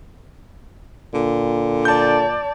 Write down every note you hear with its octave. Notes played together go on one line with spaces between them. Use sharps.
A#2 D3
D5 A5 G6